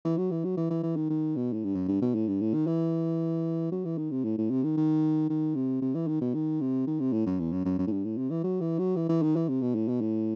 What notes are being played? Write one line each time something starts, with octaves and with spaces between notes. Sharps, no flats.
E3
F#3
E3
F#3
E3
E3
E3
D#3
D#3
B2
A2
G2
F#2
G2
B2
A2
G2
A2
D#3
E3
F#3
E3
D#3
C3
A2
A2
C3
D#3
D#3
D#3
C3
C3
E3
D#3
B2
D#3
C3
D#3
C3
A2
F#2
E2
F#2
F#2
F#2
A2
G2
A2
C3
E3
F#3
E3
F#3
E3
E3
D#3
E3
C3
B2
A2
B2
A2